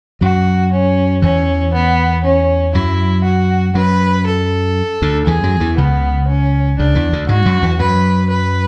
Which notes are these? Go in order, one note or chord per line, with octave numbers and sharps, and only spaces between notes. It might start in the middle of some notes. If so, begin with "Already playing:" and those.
F#2 F#3 F#4
C#4
E2 E3 C#4
B3
C#4
F#2 F#3 E4
F#4
F#2 F#3 B4
A4
D2 D3
E2 E3 G#4
F#2 F#3
E2 E3
C#2 C#3 B3
C#4
C#2 C#3 D4
E2 E3
D2 D3
G#2 G#3 F#4
F#2 F#3
E2 E3
F#2 F#3 B4
B4